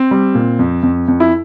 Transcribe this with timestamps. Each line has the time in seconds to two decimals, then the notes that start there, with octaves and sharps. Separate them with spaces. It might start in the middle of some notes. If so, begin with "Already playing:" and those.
Already playing: C4
0.11 G3
0.35 A#2
0.59 F2
0.83 F2
1.08 F2
1.20 E4